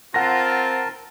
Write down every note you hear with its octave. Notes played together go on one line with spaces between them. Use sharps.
C4 F4 A#4 F#5 A5 A#6